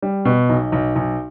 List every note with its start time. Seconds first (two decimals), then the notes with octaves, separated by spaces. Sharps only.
0.02 G3
0.25 B2
0.49 B1
0.72 B1
0.96 B1